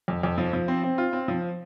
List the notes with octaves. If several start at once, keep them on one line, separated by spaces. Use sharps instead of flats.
F2
F2
F3
F3
C4
C4
F4
C4
F3